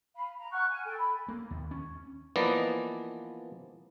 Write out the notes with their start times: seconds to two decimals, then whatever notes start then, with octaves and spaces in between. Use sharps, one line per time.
0.15 F5 B5
0.37 A#5
0.52 F#5 C#6 F6 F#6
0.69 G#5
0.86 A4 G5
0.98 B5
1.28 A#3
1.51 D#2
1.71 C#4
2.36 E3 F3 A#3 B3 D5 D#5